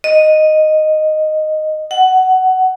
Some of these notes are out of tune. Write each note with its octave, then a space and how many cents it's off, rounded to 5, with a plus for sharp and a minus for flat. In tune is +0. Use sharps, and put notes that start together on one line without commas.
D#5 -5
F#5 +15